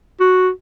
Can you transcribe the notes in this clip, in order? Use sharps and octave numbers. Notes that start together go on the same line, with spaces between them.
F#4